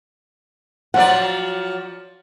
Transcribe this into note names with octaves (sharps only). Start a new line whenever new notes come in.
F3 F#3 D5 F#5